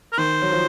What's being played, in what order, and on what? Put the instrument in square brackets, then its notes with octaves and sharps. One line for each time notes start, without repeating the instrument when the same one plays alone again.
[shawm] A#4
[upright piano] D#3 [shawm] C5
[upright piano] F#3
F3